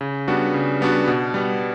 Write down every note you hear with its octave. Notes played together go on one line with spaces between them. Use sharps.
C#3
G3 B3 D4 F#4
C#3
G3 B3 D4 F#4
B2
G3 B3